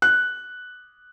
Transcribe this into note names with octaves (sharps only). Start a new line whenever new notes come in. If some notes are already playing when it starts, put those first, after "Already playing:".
F#6